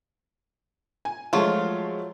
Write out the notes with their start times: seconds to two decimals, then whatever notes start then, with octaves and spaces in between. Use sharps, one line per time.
1.05 G#5
1.33 F3 F#3 G#3 A3 F4